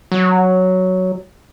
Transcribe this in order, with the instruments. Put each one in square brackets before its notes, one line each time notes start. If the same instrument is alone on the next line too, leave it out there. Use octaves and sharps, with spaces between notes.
[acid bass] F#3